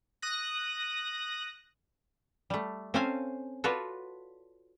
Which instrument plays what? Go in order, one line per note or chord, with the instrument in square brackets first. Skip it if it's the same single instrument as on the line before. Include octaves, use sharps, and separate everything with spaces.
[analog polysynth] D#6 F#6 A#6
[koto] G3 A3
C4 C#4 A4 C5 F5 G#5
F4 F#4 A4 B4 C#5 D5